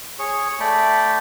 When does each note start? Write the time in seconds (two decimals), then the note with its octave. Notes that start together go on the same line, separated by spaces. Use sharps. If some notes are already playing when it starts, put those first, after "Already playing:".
0.19 G#4 C#5 C#6
0.60 A3 D5 G5 B5